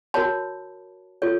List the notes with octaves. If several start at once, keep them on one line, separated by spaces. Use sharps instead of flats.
F#4 A#4 C#5 A5 B5
F4 A4 C#5